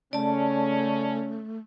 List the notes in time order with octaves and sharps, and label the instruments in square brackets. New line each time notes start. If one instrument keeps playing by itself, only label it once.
[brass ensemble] C#3 C#4 [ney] A3 [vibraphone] D5 A5